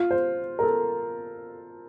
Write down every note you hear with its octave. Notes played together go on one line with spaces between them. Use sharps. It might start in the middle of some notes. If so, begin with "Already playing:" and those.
Already playing: F4
C5
A#4
A4